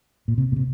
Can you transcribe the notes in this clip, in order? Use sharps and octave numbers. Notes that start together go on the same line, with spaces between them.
A#2
C3
A#2
C3